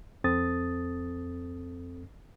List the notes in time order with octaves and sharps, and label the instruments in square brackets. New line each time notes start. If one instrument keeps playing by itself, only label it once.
[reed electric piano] F2 C4 A4 D#6 A6